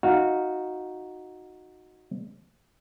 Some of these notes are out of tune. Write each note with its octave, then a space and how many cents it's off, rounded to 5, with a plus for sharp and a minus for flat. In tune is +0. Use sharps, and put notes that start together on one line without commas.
D#4 +0 F#4 -15 F5 +0